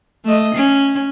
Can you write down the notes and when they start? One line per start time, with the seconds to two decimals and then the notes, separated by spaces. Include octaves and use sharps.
0.25 A3 D#5
0.55 C#4